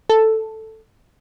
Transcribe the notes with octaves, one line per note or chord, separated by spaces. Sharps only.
A4